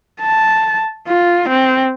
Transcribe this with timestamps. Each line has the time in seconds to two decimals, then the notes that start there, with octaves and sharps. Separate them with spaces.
0.22 A5
1.08 F4
1.49 C4